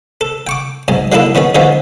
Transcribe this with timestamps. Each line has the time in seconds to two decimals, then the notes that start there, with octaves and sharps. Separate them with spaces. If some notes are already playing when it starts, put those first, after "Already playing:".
0.21 A4
0.47 G5 C#6 D6
0.88 B1 G#2 G#5
1.12 F#3 G#3 A#3 D#4 E4 A4
1.35 D#3 B3 C#4 G#4
1.55 D3 E3 F3 G#3 B3 C#4